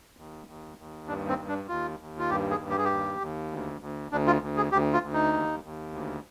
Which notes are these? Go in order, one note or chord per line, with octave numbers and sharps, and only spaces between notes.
D#2
D#2
D#2
G2 D4
C4
G2
D4
D#2 F4
D#2
F4
G2 G4
G#4
G2
G4
G#4
G4
D#2
D#2
D2
D2
D2 D4
F4
D2
G#4
D2 G4
F4
D2
D#4
D#2
D#2
D2